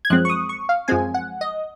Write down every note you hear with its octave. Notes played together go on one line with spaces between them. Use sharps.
G#6
F#2 F3 G#3 C4 F#6
C#6
D#6
C#6
F5
F#2 F3 G#3 C4 G#5
F#5
D#5